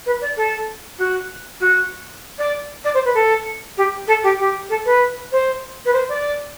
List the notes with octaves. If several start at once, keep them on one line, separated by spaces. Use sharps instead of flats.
B4
D5
A4
F#4
F#4
D5
D5
C5
B4
A4
G4
A4
G4
G4
A4
B4
C5
B4
C5
D5